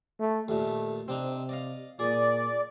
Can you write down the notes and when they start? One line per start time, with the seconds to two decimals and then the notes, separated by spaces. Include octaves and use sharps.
0.19 A3
0.48 D#2 A#2 A3
1.08 C3 C4 D4 D#4
1.49 D5 D#5 F5
1.99 A#2 G#4 D5 D#6